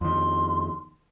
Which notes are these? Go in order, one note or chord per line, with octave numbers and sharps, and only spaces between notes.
F2 D#3 C6